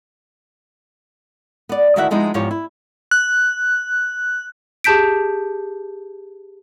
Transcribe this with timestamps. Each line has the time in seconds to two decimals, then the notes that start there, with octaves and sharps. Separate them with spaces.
1.69 B3 D5
1.96 D2 D#3 E4 F#4 E5 F#5
2.11 F3 G#3 B3 D#4 E4
2.34 E2 G#2 F3 G4 C#5
2.51 E4
3.11 F#6
4.84 G4 G#4 A5 G6 B6 D7